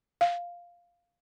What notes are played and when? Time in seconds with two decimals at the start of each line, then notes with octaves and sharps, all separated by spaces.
0.21 F5